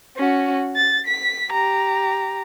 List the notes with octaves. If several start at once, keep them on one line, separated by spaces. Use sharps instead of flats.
C#4 F#4
A6
B6
G4 A#5